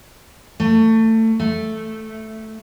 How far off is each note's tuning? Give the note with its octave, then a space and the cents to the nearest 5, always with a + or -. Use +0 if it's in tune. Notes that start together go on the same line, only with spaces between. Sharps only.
A3 +25
A3 -5